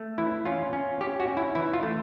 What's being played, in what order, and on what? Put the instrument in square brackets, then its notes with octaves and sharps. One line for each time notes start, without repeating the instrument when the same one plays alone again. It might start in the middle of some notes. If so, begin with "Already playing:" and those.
Already playing: [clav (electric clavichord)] A3
E3 E4
C#4 F4
C#4
C#4 G4
F#4
C#4
E4
E3 E4
F4
A3